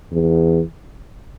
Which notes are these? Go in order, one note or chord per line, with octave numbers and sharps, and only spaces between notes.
E2